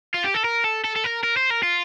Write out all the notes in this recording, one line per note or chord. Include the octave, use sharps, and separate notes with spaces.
F4
G4
A4
A#4
A4
A4
A4
A#4
A#4
C5
A#4
F4